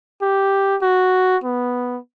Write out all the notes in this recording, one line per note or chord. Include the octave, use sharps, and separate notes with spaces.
G4
F#4
B3